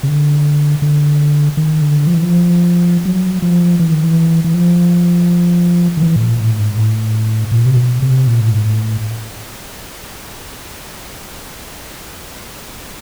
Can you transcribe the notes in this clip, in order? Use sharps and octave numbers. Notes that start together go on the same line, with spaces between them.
C#3
D3
D3
D#3
D3
F3
E3
F3
F#3
F3
E3
D#3
E3
E3
F3
D#3
E3
A2
A#2
A2
G#2
A2
A#2
C3
B2
C3
A#2
A2
G#2
A2